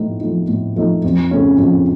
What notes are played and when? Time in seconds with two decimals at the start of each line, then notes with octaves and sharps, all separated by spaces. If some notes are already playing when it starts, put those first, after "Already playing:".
Already playing: A2 F3 A3 D#4
0.21 F3 A3 D#4
0.48 A2
0.76 F3 A3 D#4
1.04 F2
1.31 C#3 A3 C#4
1.59 F2